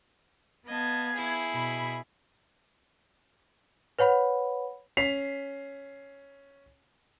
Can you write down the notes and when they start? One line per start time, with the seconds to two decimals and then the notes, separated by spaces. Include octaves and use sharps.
0.67 B3 D#5 F5 A5 G#6
1.13 E4 G#4
1.54 B2 B5
3.99 B4 C#5 F#5 B5
4.97 C#4 B6 C7 F7